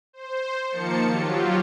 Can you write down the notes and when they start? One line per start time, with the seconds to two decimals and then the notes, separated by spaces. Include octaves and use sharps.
0.13 C5
0.69 D#3 F3 A#3 A5 C#7
1.05 F#3 F4 G4